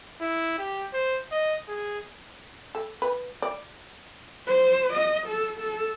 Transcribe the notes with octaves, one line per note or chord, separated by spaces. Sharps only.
E4
G4
C5
D#5
G#4
A4
B4
D5
C5
D#5
A4
A4